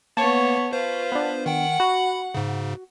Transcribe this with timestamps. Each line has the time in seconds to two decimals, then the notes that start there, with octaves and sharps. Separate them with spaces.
0.17 A#3 B3 C#5 A5 C#6
0.73 F4 B4 C5
1.12 B3 D4
1.46 D#3 F#5 G5
1.80 F#4 B5
2.35 G#2 C#3